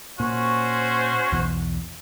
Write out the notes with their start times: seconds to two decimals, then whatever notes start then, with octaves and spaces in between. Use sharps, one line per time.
0.20 A#2 C#4 F#4 C5
1.32 B1 E2 B2